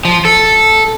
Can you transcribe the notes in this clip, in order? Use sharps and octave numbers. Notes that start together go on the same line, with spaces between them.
F3
A4